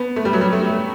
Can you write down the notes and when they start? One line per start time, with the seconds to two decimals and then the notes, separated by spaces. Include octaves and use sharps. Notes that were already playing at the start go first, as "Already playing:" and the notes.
Already playing: B3
0.16 A3
0.25 G3
0.33 F#3
0.41 G3
0.53 A3